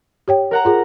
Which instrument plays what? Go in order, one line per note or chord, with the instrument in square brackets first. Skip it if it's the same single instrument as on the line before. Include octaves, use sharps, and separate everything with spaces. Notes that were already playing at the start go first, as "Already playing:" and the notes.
[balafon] G4 C#5 G5
[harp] A#4 F#5 A#5
[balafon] F4 G#4